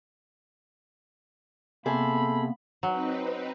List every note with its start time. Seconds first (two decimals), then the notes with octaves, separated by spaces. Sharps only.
1.86 C3 A#3 B3 G#4 A4 B5
2.83 F#3 C4 D#4 B4